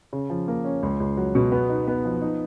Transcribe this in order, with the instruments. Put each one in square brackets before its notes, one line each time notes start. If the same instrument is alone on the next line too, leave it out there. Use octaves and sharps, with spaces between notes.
[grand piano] C#3
F3
A#3
C#4
C#2
C#2
F#3
B2
B3
D#4
B3
F3
D#4